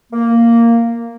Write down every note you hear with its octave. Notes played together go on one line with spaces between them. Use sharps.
A#3